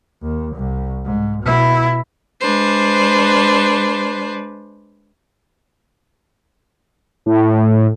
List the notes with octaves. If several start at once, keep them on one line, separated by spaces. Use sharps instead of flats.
D#2
C2
G#2
B2 E4
G#3 D4 B4 C5
A2